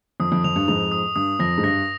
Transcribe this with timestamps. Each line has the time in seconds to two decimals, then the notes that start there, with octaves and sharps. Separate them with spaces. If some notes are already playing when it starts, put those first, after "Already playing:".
0.20 F2 D#6
0.32 F2
0.44 F2 F7
0.56 G2
0.68 F2 G#2 F7
0.92 D#6
1.16 G2 D#6
1.39 F2 A#6
1.58 G#2
1.63 G2 A#6